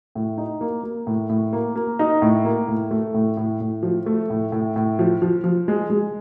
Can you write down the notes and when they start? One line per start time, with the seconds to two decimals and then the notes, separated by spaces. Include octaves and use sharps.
0.15 A2
0.38 D#4
0.61 A#3
0.83 A#3
1.07 A2
1.29 A2
1.53 A#3
1.76 A#3
1.99 D#4
2.22 A2
2.45 A#3
2.68 A2
2.91 A3
3.14 A2
3.37 A2
3.60 A2
3.83 F3
4.06 A3
4.30 A2
4.52 A2
4.76 A2
4.99 F3
5.22 F3
5.44 F3
5.68 G#3
5.90 G#3